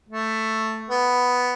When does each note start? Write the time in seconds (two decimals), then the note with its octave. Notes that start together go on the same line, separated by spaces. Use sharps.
0.09 A3
0.90 B3